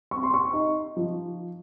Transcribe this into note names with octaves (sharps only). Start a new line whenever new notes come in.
C4 C#6
C6
C#6
D#4
F3